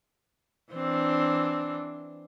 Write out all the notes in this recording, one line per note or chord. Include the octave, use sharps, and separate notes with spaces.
E3 C4 D4